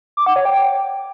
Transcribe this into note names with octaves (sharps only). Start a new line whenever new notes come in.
D6
F#5
C#5
G5